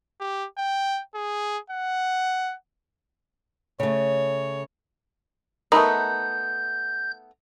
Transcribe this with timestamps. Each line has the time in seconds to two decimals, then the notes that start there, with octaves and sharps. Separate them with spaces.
0.20 G4
0.58 G5
1.15 G#4
1.70 F#5
3.80 C#3 A3 C#5
5.72 A3 B3 D#4 A#4 A#5 B5 D#6 G6